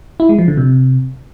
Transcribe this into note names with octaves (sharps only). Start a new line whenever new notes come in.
E4
G#3
F3
D3
C3